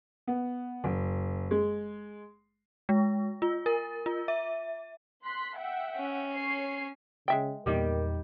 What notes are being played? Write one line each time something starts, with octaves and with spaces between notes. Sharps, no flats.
B3
F#1
G#3
G#3
F4
A#4
F4
E5
C6 F#6 B6
E5 F#5 G5
C#4
C#5 C7
C#3 G#3 E5 G5
E2 A#2 D#3 G3 G4 A#4